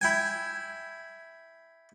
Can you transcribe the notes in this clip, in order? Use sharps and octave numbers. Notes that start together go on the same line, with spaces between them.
E4 G5 G#5